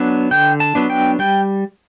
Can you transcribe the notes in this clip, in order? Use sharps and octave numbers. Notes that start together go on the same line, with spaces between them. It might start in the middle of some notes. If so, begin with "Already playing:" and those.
Already playing: F#3 B3 D4
D3 G5
A5
F#3 B3 D4
G5
G3 G5